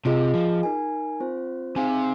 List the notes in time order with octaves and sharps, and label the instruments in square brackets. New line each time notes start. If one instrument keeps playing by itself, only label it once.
[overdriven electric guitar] C3 [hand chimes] F4 G#4 D#5
[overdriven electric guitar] F3
[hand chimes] D#4 A#4 G#5
C4 F4 C5
[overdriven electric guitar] C3 [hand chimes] D#4 G#4 F5 G#5